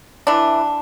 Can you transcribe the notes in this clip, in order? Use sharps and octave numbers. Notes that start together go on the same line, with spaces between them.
E3 D4